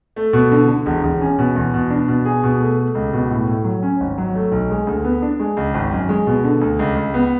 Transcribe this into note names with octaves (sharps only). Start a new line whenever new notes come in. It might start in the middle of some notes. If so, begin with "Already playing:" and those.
A3
B2
D3
D3
E1
E1
C#4
B2
E2
B2
D4
B2
G#4
B2
A3
A3
C#2
B2
A2
A2
F#3
C#4
G#1
F#3
A3
B1
G#3
D2
B3
D4
G#3
C#2
G#1
F#2
G#3
B2
D3
D2
C#2
C#2
B3